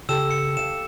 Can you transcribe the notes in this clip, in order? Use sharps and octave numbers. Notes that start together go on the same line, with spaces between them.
C#3 G4 A4 E6 E7
C#7
F5 E7